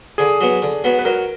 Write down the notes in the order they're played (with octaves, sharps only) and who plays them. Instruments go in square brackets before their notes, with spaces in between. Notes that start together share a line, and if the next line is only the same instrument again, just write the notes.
[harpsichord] D3 [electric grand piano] G#4
[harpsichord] F#3 B3
D3
F#3 B3
[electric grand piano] B4
[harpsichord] F#3 [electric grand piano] A#4